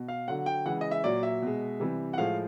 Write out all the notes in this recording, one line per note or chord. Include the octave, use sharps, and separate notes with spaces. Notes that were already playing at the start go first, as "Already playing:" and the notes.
Already playing: B2
F5
D3 F#3 F#5
G5
C#3 E3 G#3 F#5
D#5
E5
A#2 F#3 D5
E5
B2 G#3
C3 E3 G3
F#5
A2 F3 G#3 F5